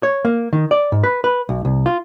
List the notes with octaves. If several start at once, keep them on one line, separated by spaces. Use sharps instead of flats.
C#5
A#3
D#3
D5
G#2
B4
B4
B1
C2
F4